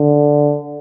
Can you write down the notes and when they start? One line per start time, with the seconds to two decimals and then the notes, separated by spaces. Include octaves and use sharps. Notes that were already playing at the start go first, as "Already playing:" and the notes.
Already playing: D3